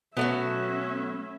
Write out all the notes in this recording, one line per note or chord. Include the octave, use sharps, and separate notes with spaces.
B2 F#3 A3 B3 C#4 D4 F#4 E5